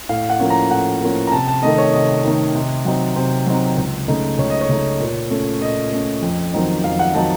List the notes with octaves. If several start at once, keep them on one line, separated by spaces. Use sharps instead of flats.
A2 F5
F#5
F3 A#3 C#4
A#5
A2 F#5
F3 A#3 C#4
A#5
C3 A5
A5
D#3 A3 D#4 D#5
C#5
C3 D#5
D#3 A3 D#4
C3
F#3 C4 D#4
C3 C5
F#3 C4 D#4
C#2
C#3 A3 D#4
C#2 C#5
D#5
C#5
C#3 A3 D#4
A#2
A3 C#4
A#2 D#5
A3 C#4
F2
D#3 F#3 C4 D#4
F2 F5
F#5
D#3 F#3 C4 D#4 A5